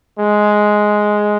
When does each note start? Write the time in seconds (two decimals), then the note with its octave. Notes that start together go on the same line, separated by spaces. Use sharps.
0.19 G#3